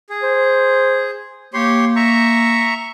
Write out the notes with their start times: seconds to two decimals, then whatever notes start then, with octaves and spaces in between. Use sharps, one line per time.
0.10 G#4
0.23 C5
1.54 A#3 G4 C#5 C6
1.96 E5 A#5 C#6